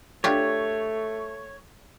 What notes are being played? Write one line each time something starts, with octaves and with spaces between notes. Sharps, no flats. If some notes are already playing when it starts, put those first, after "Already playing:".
A3 D4 F4 G4 C#5